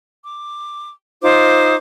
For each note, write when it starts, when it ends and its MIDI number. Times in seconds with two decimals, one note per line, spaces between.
0.25 0.90 86
1.23 1.75 63
1.23 1.75 65
1.23 1.75 72
1.23 1.75 86